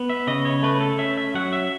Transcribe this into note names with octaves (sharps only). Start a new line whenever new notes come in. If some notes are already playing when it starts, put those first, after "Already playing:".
Already playing: B3
E5
C#3 D#5
C#5
A3 B4
A4
C#4 E5
E5
F#3 F#5
E5